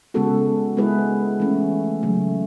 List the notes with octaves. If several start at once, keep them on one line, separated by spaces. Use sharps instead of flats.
C#3 G#3 B3 F#4 A4
G#3 B3 E4 G#4 B4
E3 A3 C#4
C#3 F#3 A3